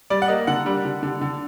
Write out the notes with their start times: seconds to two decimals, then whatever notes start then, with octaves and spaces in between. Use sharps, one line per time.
0.10 G3 D5
0.22 F#5
0.28 A#3 D#5
0.47 D3 F#5
0.66 G3
0.85 D3
1.03 D3
1.21 D3